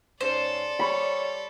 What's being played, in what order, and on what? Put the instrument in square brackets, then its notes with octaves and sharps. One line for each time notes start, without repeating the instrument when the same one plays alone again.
[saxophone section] G#2 C#4 [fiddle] A4 D5 [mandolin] C5
[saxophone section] G3 C#5 [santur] B5